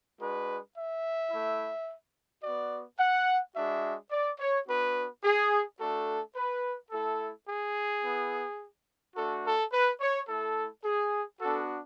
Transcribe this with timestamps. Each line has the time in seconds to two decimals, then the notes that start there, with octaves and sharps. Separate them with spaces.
0.20 G#3 D4 F#4 B4
0.75 E5
1.31 A3 E4
2.43 B3 F#4 D5
2.99 F#5
3.55 G#3 D4 F#4 E5
4.11 D5
4.39 C#5
4.67 B3 D4 F#4 B4
5.23 G#4
5.79 A3 D4 F#4 A4
6.35 B4
6.91 A3 E4 A4
7.48 G#4
8.04 B3 E4
9.16 A3 D4 F#4 A4
9.45 A4
9.72 B4
10.00 C#5
10.28 A3 E4 A4
10.84 G#4
11.40 B3 D4 F#4 A4